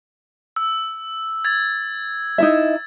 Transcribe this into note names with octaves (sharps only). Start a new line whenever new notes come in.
E6
G#6 A6
D#4 E4 E5